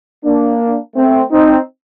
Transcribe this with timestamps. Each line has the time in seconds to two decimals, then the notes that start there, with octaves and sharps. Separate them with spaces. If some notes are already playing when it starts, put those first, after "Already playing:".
0.24 A#3 D4
0.96 A3 C4
1.31 C4 D#4